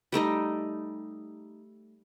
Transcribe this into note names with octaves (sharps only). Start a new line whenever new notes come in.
G3 A3 D#4 D#5